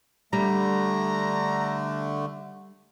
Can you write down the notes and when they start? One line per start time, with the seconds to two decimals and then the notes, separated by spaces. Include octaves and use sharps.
0.33 D3 G3 A3 A#5